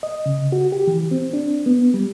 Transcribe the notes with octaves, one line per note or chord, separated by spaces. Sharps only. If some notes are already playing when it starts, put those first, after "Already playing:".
D#5
C#3
F#4
G4
E3
C4
D4
B3
G3